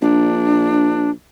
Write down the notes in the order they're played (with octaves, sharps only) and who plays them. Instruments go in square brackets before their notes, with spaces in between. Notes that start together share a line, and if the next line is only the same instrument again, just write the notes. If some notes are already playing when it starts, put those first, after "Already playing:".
[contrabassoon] A#1 [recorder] D4